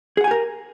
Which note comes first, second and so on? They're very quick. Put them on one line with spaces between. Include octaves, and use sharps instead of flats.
G#4 F#5 G#5 G4 A#4